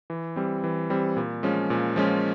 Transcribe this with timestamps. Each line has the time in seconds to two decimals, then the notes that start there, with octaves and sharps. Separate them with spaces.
0.10 E3
0.36 G3 C4
0.64 E3
0.90 G3 C4
1.17 A#2
1.43 F3 G#3 C#4
1.70 A#2
1.96 F3 G#3 C#4